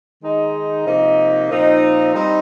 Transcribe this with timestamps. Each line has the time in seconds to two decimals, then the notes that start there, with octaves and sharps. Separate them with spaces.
0.21 D#3 G#3 D#4
0.84 C3 F3 A#3 D#4
1.50 A#2 F3 C4 D#4
2.14 G3 C4 D#4